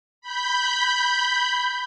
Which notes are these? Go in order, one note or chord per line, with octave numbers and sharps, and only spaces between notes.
B5 G6